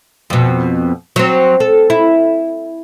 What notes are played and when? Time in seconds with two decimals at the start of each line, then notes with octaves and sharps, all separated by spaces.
0.30 F2 B2
1.16 F#3 C4
1.60 A4
1.90 E4